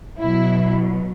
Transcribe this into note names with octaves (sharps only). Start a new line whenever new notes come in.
B2 F#3 E4